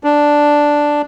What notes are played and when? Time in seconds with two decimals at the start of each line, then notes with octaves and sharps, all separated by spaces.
0.04 D4